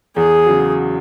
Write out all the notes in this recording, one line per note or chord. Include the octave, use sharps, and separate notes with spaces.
E2 G#4
C#3 F#3